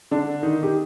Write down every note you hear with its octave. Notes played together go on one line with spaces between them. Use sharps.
D3 D4
D#3 D#4
G4